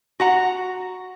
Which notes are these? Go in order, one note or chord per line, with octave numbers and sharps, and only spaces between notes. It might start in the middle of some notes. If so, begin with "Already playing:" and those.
F#4 F#5 A#5